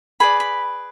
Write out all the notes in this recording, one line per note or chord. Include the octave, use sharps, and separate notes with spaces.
G#4 B4 D5 B5
B5